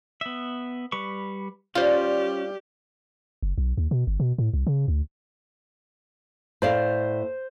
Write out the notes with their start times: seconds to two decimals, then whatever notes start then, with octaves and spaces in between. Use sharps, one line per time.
0.21 B3 E5
0.92 G3 B4 C#6
1.75 G3 C#4 F4 G4 C5
3.43 F#1
3.58 B1
3.77 D#2
3.91 B2
4.07 G1
4.20 B2
4.38 A2
4.54 C2
4.67 C#3
4.88 D2
6.62 A2 C5 D5 F5